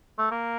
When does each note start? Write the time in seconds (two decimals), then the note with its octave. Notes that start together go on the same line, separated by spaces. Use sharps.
0.19 A3
0.31 A#3